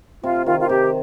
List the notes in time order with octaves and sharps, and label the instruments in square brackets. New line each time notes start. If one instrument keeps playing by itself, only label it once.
[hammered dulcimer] C3 [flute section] F4
[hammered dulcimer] D#3 [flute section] F4
[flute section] F4
[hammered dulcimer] C3 [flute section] G4